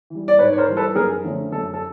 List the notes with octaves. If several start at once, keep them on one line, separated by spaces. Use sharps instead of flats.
E3 G3
D5
G#2 B4 C#5
C#5
A#4 C5
E3 G3
A4 B4
F#2 G#4 A#4
D3 F3 A3 C#4
F#2 A4
A4